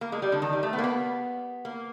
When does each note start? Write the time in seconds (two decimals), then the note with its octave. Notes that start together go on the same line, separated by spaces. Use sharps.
0.01 A#3
0.12 G#3
0.22 G3
0.32 D3
0.42 D#3
0.53 G3
0.63 A3
0.73 B3
0.78 A#3
0.84 B3
1.65 A#3